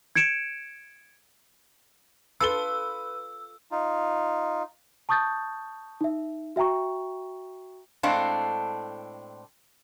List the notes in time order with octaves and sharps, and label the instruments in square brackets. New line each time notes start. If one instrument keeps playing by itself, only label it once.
[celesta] G#6 C#7 D7 E7
[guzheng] F4 A4 [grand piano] B4 G7 [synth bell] E6
[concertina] D#4 F4
[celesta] A5 C#6 D#6 G6 A6
D#4 E5
F#4 E5 G5 A#5 C#6
[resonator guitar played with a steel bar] A2 G#3 C4 D4 A4 F5